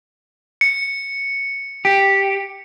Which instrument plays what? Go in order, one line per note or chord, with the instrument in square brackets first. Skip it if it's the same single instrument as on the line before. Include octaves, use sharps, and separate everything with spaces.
[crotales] C#7
[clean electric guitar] G4